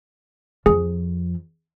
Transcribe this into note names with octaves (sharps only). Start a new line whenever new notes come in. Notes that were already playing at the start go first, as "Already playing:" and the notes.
F2 F3 G#4